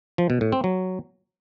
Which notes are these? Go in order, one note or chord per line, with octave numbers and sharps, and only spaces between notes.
F3
B2
A2
C4
F#3